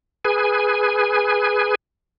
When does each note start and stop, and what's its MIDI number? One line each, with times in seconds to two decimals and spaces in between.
0.25 1.75 68
0.25 1.75 71
0.25 1.75 80